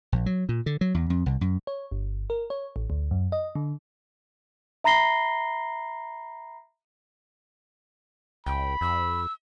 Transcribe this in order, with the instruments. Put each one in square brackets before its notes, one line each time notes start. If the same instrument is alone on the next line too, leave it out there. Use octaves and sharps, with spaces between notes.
[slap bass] A#1
F#3
A#2
D3
F#3
E2
F2
C2
F#2
[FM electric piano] C#5
G1
A#4
C#5
A1
D2
F#2
D#5
D3
[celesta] E5 A#5 B5 A#6 C7 G7
[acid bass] C#2 [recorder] G5 [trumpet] B5
[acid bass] F2 [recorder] E6